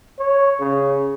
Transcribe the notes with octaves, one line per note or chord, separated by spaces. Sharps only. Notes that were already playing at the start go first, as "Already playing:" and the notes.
C#5
C#3